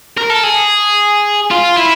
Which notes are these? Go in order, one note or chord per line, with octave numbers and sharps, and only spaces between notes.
A#4
A4
G#4
F4
E4